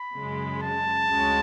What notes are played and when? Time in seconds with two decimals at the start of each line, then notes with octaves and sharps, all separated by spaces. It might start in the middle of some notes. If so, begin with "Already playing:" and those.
Already playing: B5
0.16 F#2 C#3 G#3
0.62 A5
1.09 D2 C#3 G#3 C#4 F#4